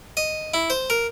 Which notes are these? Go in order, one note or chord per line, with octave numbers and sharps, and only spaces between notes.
D#5
E4
C5
A#4